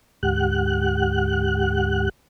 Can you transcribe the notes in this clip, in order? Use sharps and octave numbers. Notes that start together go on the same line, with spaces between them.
D2 G#2 G4 F#5 F#6